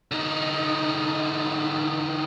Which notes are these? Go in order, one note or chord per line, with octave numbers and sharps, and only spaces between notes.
D3 D#4